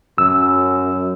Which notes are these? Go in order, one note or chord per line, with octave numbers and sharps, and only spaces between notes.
F#2 E6